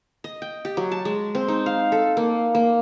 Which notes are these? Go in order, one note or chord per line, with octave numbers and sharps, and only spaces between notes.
D#5
G5
G4
F#3
A5
G#3
C4
D#4
F5
A4
A#3
A#3